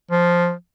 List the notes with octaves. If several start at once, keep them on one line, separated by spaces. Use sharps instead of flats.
F3